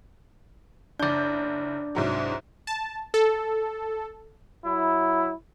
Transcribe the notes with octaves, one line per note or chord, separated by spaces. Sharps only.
F#1 D4 D5 G6
C2 G#2 F#3
A5
A4
F#3 E4